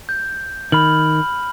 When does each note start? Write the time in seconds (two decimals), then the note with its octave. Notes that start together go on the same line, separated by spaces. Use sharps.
0.09 G6
0.72 D#3 B5 F6 F#7